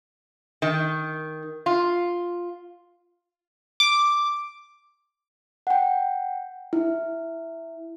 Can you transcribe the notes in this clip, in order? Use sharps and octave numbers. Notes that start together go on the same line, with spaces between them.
D#3
F4
D6
F#5 G5
E4